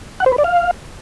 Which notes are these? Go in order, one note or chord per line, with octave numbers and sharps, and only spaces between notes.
F#5
C5
B4
D5
F5